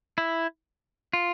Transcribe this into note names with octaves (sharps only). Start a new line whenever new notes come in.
E4
F4